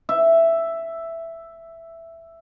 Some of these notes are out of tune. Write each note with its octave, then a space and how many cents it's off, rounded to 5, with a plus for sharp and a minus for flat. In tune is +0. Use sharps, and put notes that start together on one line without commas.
E5 +5